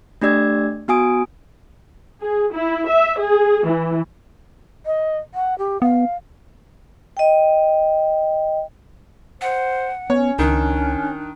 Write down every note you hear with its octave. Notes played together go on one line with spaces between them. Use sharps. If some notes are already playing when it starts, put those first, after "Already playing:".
A3 D4 G4 D5 E6 G#6
B3 F#4 G#5 D#6 D7
G#4
E4
E5
G#4
E3
D#5
F#5
G4
B3 F5
D#5 G5
C5 F#5
B3 C#4 C#5
C#2 D#3 D4